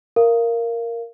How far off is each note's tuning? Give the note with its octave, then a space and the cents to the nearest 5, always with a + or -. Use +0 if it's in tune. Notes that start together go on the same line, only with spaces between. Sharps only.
A#4 +0 F5 -25